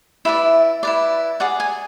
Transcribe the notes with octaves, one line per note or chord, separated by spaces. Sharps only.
E4 B4 D5 E5
E4 B4 D5
G#4 D5 F#5
G#5